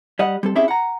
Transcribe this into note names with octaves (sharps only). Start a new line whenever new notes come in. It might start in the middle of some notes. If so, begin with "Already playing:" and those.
G3 D#5 F#5
G3 C4 A4
C4 C#4 E4 G4 G#4 E5
F#5 A#5